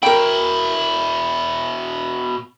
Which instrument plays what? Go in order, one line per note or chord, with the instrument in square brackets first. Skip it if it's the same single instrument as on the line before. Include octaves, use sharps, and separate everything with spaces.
[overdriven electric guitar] B2 E4 [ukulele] A#4 G5